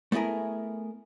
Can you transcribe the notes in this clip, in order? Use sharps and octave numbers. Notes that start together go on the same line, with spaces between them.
A3 B3 E4 G#4 A#4